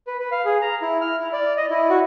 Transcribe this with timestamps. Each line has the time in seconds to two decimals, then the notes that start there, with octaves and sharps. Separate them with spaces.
0.07 B4
0.20 B4
0.32 F5
0.45 G#4
0.62 A#5
0.82 E4
1.01 F6
1.20 E4
1.33 D5
1.57 D#5
1.70 E4
1.90 F#4